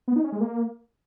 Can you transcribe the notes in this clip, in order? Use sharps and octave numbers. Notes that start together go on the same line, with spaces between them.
B3
D#4
C#4
G#3
A#3